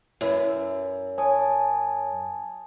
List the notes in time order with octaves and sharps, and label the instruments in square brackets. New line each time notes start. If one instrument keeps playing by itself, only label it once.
[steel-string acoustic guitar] F#2 [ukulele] E4 B4
[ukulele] C#5 [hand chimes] G#5 A5 D#6